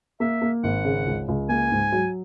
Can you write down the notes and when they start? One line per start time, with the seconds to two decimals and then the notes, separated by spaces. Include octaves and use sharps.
0.20 A#3 E5
0.42 A#3
0.64 G#1 F#5
0.85 C#3
1.06 C#2
1.28 C#2
1.49 A#3 G#5
1.71 G#2
1.92 F#3